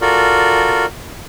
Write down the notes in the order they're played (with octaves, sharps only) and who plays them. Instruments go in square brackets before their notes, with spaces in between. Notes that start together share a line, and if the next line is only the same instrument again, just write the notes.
[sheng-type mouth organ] F4 F#4 A4 A#4 D5